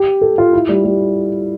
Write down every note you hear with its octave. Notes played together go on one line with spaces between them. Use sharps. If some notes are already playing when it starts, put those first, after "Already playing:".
Already playing: G4
A4
F4
E4
G3
G3